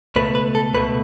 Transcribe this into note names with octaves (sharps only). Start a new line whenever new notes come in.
C#2 B2 A3 B4
B4
A4
C#2 B2 A3 B4